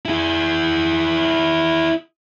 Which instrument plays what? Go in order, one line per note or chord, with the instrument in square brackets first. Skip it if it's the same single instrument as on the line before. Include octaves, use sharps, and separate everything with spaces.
[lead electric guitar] E4 G#4